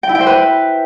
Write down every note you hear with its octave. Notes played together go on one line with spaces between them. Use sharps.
G5
E4
G5
C5
B4